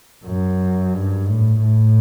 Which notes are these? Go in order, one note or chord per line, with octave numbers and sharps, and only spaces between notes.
F#2
G2
A2
A2